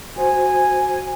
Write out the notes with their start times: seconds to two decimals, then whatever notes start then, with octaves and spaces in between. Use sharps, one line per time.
0.16 F#4 C5 G#5